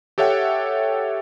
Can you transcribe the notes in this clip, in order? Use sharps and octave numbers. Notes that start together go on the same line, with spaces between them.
G4 A4 C#5 E5 F#5 G5